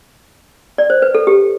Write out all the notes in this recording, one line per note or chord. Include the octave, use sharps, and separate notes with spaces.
D5
C5
B4
A4
G4